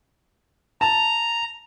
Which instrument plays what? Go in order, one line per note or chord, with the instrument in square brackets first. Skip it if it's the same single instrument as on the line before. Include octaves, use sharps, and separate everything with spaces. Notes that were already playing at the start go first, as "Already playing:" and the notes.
[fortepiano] A5 [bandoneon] A#5